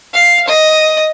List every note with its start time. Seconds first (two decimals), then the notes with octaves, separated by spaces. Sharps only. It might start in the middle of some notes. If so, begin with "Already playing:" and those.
0.13 F5
0.48 D#5